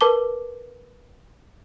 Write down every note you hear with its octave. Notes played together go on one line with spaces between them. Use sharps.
A#4 B4 A5 D6 G7